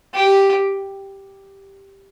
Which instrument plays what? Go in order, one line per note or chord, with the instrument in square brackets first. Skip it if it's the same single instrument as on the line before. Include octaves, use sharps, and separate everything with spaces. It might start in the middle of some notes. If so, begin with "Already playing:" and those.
[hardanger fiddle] G4